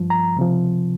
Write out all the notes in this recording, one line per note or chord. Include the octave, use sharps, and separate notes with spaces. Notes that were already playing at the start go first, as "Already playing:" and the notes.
Already playing: G2 F3
A#5
C#2 C3 F3